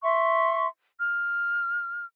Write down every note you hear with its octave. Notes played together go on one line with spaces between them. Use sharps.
E5 C6 C#6
F6